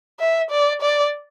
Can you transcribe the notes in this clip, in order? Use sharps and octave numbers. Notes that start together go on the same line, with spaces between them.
E5
D5
D5